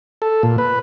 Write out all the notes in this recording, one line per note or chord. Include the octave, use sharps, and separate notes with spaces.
A4
A#2
B4